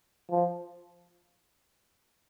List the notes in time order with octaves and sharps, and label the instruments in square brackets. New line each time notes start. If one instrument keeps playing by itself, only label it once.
[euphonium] F3